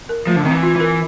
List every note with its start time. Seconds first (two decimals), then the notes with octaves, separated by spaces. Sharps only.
0.09 A#4
0.27 F3 A3
0.36 D3
0.44 D#3 C4
0.51 E3
0.63 F4
0.75 E3 A#4